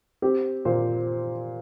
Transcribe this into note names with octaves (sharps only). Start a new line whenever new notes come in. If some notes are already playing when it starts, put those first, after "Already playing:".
C4 G4
A#2 C5